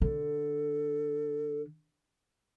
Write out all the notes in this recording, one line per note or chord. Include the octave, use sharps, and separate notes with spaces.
D3 A4